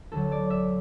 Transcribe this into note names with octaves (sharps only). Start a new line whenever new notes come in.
D2 D3 F#3 A4
D5
E5